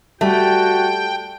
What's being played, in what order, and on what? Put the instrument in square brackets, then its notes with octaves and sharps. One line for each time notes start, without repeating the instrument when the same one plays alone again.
[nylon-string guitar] G3 [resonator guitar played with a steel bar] A3 [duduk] F#4 [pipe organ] G5